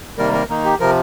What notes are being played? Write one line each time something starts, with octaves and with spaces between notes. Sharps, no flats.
C3 D#3 G3 A#3 A#4
A#4
D#3 A#3 D#4
G4
C3 F3 A#4